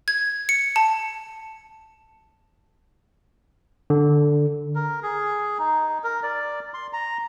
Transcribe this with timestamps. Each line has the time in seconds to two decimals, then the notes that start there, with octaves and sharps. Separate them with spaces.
0.08 G#6
0.49 C#7
0.76 A5
3.90 D3
4.75 A#4
5.03 G#4
5.59 D#4
6.04 A#4
6.23 D5
6.74 C6
6.93 A#5